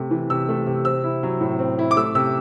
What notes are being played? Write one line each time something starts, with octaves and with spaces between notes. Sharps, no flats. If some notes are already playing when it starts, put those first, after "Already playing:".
Already playing: C3 A3
E3
C3 E6
A3
C3
C4 E6
E4
F#3
A2
C4
E4
D6
A3 E6
C3 E6